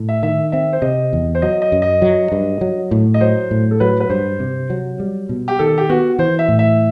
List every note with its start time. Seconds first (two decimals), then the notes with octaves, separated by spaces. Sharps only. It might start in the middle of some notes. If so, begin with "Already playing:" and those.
Already playing: A2
0.09 E5
0.23 D#3 E5
0.52 C4 E5
0.73 C5
0.82 C3 D#5
1.13 E2
1.35 C5
1.42 F#3 D#5
1.62 D#5
1.72 F#2
1.82 D#5
2.02 F#3
2.32 G2
2.61 F#3
2.91 A2
3.14 D#5
3.21 F#3 C5
3.51 A2
3.71 A4
3.80 F#3 B4
4.00 B4
4.10 G2 C5
4.40 C3
4.70 F#3
5.00 G3
5.29 B2
5.48 G4
5.59 D#3 A4
5.78 G4
5.90 B3 F#4
6.19 E3 C5
6.39 E5
6.48 A2
6.59 E5